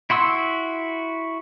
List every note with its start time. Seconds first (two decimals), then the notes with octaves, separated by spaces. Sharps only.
0.10 E4 F#4 C6 E6